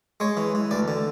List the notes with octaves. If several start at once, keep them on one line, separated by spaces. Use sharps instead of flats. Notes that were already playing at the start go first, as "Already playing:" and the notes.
G#3 C#5
E3
E3
D2 D5
D3